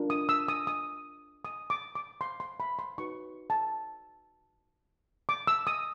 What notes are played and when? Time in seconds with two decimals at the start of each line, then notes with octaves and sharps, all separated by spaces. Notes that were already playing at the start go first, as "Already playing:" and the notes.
Already playing: D4 F4 A#4
0.10 D#6
0.29 E6
0.48 D#6
0.67 D#6
1.45 D#6
1.70 D6
1.95 D6
2.21 C6
2.40 C6
2.60 B5
2.79 C6
2.98 D#4 F#4 B4 C#6
3.50 A5
5.29 D6
5.47 E6
5.67 D#6